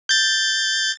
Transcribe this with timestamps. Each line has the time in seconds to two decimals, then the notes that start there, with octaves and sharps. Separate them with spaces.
0.09 G6 A6